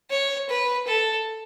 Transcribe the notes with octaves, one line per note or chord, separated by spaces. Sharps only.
C#5
B4
A4